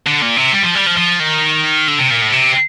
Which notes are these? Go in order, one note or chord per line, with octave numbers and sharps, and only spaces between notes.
D3
A#2
C3
G3
F3
G3
F3
F3
D#3
D3
C3
A#2
A2
C3